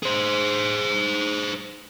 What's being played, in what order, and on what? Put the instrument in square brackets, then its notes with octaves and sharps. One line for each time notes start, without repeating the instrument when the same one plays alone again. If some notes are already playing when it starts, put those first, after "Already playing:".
[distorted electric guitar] G#4 C5